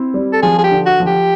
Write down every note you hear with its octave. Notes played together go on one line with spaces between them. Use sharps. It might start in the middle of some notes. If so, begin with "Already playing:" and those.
Already playing: C4 E4
G3
A4
F3 G#4
G#4
G4
D3
F#4
F3
G4